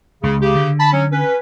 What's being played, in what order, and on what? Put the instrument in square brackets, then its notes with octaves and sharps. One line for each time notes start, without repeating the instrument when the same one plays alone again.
[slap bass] C#2 [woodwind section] C#3
[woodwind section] C#3 G4
[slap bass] D3
[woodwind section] A5 B5
F#3 C#4
C#4 B4